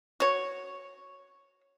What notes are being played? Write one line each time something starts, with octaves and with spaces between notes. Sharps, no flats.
F#4 C#5